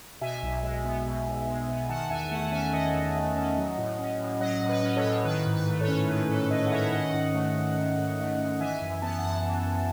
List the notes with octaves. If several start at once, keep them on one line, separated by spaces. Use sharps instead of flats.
B2 E5 G#5
B1
G#3
B3
B2
B1
G#3
B3
D#3 F#5 A5
E2 E5 G#5
A3 F#5 A5
C#4 E5 G#5
D#3 D#5 F#5
E2
A3
C#4
F#3
A2
C#4
A2
F#3 D#5 F#5
A2
B4 D#5
C#4
A4 C#5
A2
D#3 B4
G#2
B4
A3
A4 C#5
C#4
D#3 B4
G#2 A4
A3 B4 D#5
F#5
C#4 C#5 E5
D#3 D#5 F#5
G#2
A3
G#2
D#3
G#2
A3
G#2
E3 E5 G#5
F#2
B3 A5
F#2 F#5 A5
E3
F#2